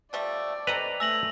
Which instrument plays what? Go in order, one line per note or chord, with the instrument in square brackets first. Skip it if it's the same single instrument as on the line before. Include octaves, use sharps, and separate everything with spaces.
[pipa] F3 G3 A3 [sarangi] D5
[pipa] C4 G4 A4 [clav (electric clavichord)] B4 D#5 A#5 [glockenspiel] F7
[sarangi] A3 [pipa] G#5 [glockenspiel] E6 A#6 F#7